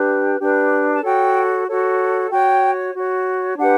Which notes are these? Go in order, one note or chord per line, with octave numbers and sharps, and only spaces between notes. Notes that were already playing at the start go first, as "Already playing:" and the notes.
Already playing: D4 G4 B4
D4 G4 B4
A5
F#4 A4 C#5 G5
F#4 A4 C#5
F#4 C#5 G5
F#4 C#5
D4 G4 B4 F#5